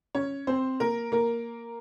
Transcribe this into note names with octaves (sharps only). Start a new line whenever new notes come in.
C#4 C#5
C4 C5
A#3 A#4
A#3 A#4